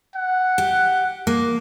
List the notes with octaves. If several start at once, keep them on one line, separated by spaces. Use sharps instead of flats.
F#5
G4
A#3